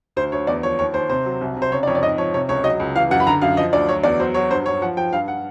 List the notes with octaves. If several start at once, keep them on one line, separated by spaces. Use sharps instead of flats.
D2 C5
D2 C#5
E2 D5
F3 C#5
D#2 C#5
D#2 C5
C3 C5
F#3
C2
C3
C5
C#3 C#5
D5
F2 C#5
D5
G#2 D#5
F3 C#5
C3 C#5
C#2 C#5
F#3 D#5
C#2
E3 F5
F#2 F#5
B5
D3 A#5
F#2 F5
F3 D#5
D2 D5
F#3 C#5
E2 D5
F#3 C5
F#3 C#5
G2 C5
G2 C#5
F3 F#5
F3 G5
G2 F5
F#5